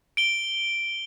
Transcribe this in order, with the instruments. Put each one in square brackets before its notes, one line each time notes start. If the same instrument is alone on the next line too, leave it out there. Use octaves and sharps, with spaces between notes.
[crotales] D7 G7